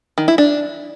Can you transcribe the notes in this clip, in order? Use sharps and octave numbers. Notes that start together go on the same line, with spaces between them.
D#3
E4
D4